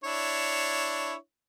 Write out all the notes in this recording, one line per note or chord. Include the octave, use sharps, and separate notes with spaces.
D4 E4 C#5